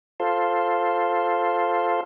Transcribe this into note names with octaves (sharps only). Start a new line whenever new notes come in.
F4 A4 C5